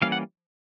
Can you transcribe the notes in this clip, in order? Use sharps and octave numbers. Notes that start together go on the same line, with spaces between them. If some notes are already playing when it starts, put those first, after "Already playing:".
E3 G3 A#3 C#4 F5
F#5